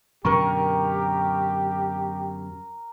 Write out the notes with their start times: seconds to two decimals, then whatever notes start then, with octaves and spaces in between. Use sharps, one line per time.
0.25 F#2 B2 D3 G4 A#4 C#6